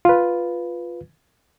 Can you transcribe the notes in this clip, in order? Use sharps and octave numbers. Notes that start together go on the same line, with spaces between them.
F4 B4